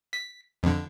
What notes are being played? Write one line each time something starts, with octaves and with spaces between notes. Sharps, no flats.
B6
F2 D3